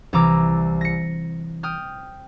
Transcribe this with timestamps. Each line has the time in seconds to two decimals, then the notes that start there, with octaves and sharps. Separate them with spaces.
0.13 C2 E3 A#5 D6 E6
0.81 A#6 C#7
1.63 G5 D#6 F6